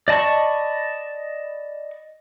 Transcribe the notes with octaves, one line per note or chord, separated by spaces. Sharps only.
D5 D#5 A5 B5 C#6